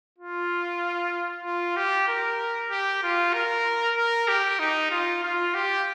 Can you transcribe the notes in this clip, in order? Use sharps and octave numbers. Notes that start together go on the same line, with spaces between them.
F4
F4
G4
A#4
G4
F4
A#4
A#4
G4
D#4
F4
F4
G4